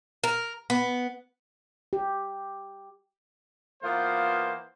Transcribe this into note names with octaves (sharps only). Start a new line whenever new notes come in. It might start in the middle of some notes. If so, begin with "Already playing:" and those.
A#4
B3
G4
E3 A#3 B3 F4 C5